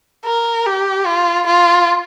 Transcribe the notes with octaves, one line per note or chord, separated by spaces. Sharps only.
A#4
G4
F4
F4